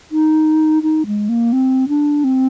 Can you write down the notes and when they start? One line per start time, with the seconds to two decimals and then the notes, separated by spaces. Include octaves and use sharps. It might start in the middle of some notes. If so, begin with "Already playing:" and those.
0.12 D#4
0.83 D#4
1.07 G#3
1.29 A#3
1.53 C4
1.88 D4
2.24 C4